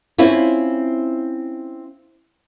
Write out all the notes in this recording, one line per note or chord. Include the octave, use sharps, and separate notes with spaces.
C4 C#4 E4 F4